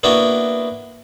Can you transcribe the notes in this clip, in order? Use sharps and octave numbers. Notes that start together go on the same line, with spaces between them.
A#3 B3 D4 E4 F#4